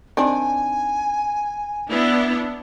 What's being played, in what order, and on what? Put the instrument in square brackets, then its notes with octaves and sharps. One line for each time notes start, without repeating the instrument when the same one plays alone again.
[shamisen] D#3 C4 D4 [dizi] G#5
[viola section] B3 D4 E4